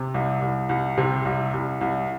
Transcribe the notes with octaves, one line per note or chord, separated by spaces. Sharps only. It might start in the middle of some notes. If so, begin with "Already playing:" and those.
Already playing: C3
C2
C2
C2
C3
C2
C2
C2